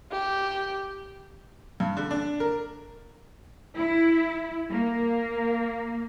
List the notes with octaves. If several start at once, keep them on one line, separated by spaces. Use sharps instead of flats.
G4
G2
D3
D4
A#4
E4
A#3